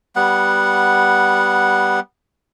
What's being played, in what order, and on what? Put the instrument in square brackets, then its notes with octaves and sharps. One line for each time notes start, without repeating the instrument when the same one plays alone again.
[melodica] G3 B3 F#5